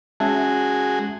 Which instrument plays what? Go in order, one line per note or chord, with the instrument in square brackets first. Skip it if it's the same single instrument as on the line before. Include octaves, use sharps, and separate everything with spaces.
[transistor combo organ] G#3 F#4 G#4 [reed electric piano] C#4 E5 A5